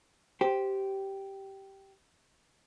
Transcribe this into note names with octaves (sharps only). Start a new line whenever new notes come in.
G4 C5